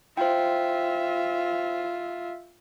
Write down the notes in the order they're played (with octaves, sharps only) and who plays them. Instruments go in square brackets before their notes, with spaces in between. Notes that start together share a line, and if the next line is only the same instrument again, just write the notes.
[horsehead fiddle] F4 E5 [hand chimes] C5 G5